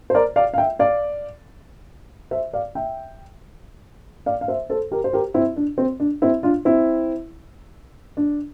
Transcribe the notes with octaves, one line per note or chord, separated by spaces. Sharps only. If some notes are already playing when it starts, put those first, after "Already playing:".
C5
A#4 D5
D5 F5
F5
E5 G5
D5 F5
C5 E5
D5 F5
E5 G5
D5 F5
F5
C5 E5
A4 C5
G4 A#4
C5
G4 A#4
C4 E4
D4
C4
D4
C4 E4
D4 F4
C4 E4
D4